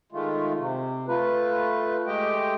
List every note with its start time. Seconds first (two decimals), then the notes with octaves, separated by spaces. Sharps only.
0.12 D#3 G#3 A3 F4
0.58 C3
1.08 A3 F4 B4
2.07 G#3 A3 G4 D#5 G5